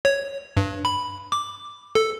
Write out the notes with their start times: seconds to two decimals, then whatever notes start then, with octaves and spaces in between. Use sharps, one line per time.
0.05 C#5
0.57 G2
0.85 B5
1.32 D6
1.95 A4